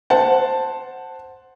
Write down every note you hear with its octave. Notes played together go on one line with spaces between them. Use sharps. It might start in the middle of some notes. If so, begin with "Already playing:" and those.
C5 F#5 A5